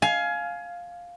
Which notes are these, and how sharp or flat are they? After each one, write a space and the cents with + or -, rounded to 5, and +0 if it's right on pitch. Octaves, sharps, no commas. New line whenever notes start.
F5 +5 G#5 +25